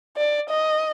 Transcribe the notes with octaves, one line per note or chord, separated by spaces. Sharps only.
D5
D#5